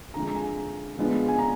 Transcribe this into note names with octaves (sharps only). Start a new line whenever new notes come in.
D3 F3 G#3 A#5
A#5
G#5
D3 F3 G#3 B3 D4
G#5
A#5